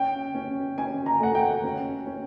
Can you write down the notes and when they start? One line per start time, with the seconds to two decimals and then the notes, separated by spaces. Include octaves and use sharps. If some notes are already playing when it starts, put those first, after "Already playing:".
Already playing: C#4 G5
0.35 C#4
0.78 C#4 G#5
1.06 A#5
1.20 A3 F#5
1.35 G5
1.64 C#4
2.07 C#4